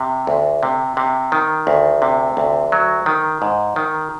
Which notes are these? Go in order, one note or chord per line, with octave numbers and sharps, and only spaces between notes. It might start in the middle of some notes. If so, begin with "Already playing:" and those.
Already playing: C3
D2
C3
C3
D#3
D2
C3
D2
F#3
D#3
G#2
D#3